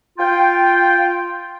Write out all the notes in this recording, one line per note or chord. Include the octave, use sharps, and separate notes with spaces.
F4 G5